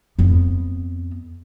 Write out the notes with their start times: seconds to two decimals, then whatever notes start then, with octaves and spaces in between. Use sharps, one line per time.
0.19 F2 B3